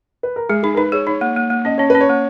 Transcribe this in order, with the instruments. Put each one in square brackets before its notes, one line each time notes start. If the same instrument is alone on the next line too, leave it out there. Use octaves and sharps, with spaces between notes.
[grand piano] B4
A#4
[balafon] G#3 [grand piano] G#4
[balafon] D#4 [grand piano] G#4
[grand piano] A#4
[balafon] D#4 [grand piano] B4
[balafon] G#4 [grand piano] C#5
[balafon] D#4 [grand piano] C#5
[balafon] A#3
A#3
A#3
[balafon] C#4 [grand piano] D#5
[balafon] C#4 [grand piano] C#5
[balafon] C#4 [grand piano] B4
[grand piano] C#5
[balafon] A#3